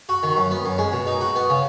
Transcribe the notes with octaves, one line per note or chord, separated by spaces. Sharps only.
F#4
D#3
F#2
B3
F#2
G#3
B2
D#4
F#4
B3
C#3